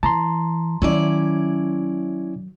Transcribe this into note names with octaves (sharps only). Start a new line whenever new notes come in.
E3 A5 A#5 C6
D#3 F#3 C#4 E4 D5